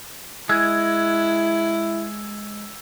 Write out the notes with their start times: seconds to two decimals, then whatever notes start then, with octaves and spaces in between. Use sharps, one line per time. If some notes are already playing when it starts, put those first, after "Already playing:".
0.49 G#3 E4 E6 G#6